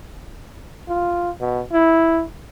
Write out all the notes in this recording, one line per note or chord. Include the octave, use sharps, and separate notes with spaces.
F4
B2
E4